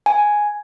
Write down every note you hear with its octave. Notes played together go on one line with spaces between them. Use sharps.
G#5